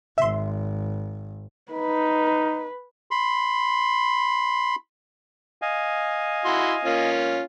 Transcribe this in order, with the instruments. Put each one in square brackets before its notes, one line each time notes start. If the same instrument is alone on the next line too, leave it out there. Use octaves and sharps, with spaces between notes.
[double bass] G#1 [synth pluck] E5 C6
[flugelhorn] D#4 [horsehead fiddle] B4
[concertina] B5 C6
D#5 F5 G#5
[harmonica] E4 F#4 C6
A#3 C#4 F4